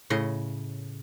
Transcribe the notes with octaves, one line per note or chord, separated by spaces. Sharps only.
A2 C#3 D#5